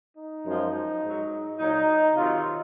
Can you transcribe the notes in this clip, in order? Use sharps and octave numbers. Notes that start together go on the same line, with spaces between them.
D#4
F#2 F3 G#3
G#2 F#3
A#2 F#3 D#4
C3 D#3 F#3 F4